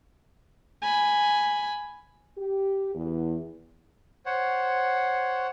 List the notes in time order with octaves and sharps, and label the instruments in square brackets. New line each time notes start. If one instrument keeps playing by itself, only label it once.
[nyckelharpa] G#5 B5
[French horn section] G4
E2
[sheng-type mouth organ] C5 C#5 F#5